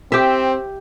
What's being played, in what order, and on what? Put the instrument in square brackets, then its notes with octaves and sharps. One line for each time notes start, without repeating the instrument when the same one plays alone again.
[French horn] C4 [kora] G4 E5